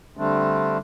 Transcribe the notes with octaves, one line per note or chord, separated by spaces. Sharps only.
D3 G3 A3 C4 D4